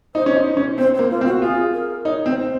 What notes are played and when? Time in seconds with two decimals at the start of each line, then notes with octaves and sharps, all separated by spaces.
0.15 D#4 C5
0.26 C#4
0.36 D#4
0.57 C#4
0.78 C4 C5
0.95 A#3 C5
1.10 F4
1.21 C4
1.26 F#4
1.42 F4 G#4
1.73 A#4
2.05 D#4 C#5
2.26 C4
2.37 C5